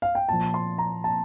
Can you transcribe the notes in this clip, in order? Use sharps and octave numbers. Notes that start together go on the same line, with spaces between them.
F5
G5
A#2 F3 A5
C6
A#5
A5